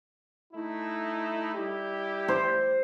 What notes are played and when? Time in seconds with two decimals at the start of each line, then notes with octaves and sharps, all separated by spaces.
0.54 A3 D#4 E4
1.55 G3 E4 G4
2.28 C5